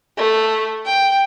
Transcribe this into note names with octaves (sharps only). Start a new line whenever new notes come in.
A3
G5